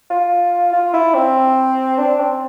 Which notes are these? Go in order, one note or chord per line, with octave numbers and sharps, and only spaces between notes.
F4
F4
E4
C4
D4
C4